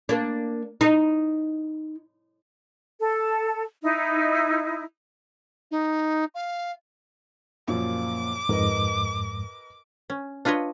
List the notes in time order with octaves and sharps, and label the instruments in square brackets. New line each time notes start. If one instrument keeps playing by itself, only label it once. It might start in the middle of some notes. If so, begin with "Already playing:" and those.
[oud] A#3 D4
D#4
[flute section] A4
D#4 E4
[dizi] D#4
F5
[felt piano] F#2 A#2 F3 [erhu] D6
[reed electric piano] F2 G#2 [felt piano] A#4 B4 D#5
[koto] C#4
D4 F4 B4 C#5 D#5